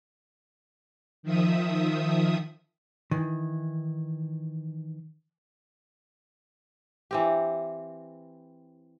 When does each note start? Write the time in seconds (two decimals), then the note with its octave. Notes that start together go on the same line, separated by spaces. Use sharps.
1.23 D#3 F3 E5 D#6
3.11 D#3 E3
7.11 E3 C4 G4